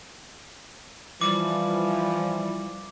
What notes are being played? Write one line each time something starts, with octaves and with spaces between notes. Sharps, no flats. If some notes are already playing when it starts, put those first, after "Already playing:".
E3 F3 G3 D6